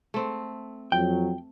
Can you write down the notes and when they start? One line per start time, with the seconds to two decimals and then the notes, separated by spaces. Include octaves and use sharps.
0.14 A3 C4
0.92 F2 F#3 G5